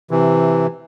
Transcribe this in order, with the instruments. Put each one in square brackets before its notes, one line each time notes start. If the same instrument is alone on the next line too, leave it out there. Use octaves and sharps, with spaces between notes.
[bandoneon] C3 E3